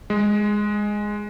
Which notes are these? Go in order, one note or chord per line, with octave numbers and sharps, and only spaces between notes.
G#3